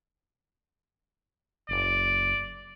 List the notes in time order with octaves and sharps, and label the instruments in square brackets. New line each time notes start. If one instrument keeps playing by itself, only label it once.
[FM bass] F#1 [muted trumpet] D5